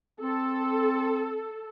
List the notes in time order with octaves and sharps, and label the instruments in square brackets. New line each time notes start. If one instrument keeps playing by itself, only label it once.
[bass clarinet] C4 [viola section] A4